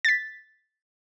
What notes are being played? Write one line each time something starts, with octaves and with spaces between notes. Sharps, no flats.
A6 B6